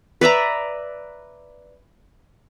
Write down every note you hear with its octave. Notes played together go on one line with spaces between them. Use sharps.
B4 D5 E5 A#5